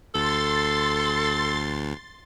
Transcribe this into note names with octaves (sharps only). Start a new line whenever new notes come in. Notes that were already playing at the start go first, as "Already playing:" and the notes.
D2 A4 C6 A6